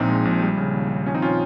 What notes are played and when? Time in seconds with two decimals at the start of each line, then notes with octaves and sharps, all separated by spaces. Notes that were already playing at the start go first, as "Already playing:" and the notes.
Already playing: A#1 A#2 F3 C4 D#4
0.09 G#3
0.25 A#1
0.42 G3
0.57 C#3
0.74 D#2
0.90 D#2
1.06 F3 C#4
1.14 C4 D#4
1.22 A#2 C#4 F4